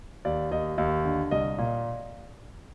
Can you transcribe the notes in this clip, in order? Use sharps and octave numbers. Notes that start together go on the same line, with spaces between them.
D#2 D5
D#2 D#5
D#2 D#5
D3
C2 D#5
A#2